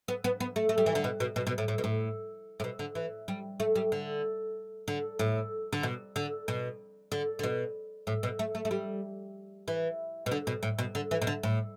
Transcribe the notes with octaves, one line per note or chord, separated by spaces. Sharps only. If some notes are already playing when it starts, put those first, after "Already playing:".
B3
B3
B3
A3
A3
G3
E3
D3
B2
B2
B2
B2
A2
A2
B2
A2
A2
B2
D3
E3
G3
A3
G3
D3
D3
A2
D3
B2
D3
B2
D3
D3
B2
A2
B2
A3
A3
A3
G3
E3
B2
D3
B2
A2
B2
D3
E3
B2
D3
A2